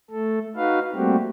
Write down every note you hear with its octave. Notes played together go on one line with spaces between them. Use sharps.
A3 A4
D#4 F#4 B4 F5
G3 A3 A#3 C4 F#4 G4